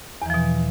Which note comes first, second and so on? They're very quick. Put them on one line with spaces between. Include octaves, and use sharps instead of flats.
E2 E3 F3 B2